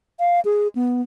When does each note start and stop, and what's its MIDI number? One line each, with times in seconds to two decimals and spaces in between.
0.20 0.40 77
0.45 0.68 68
0.75 1.02 59